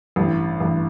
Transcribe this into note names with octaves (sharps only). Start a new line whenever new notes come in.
A1 G2 E3
A1 G2 E3